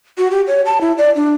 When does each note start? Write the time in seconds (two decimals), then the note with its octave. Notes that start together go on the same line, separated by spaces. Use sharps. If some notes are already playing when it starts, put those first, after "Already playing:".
0.18 F#4
0.31 G4
0.47 C#5
0.66 A5
0.81 E4
0.98 D5
1.16 D4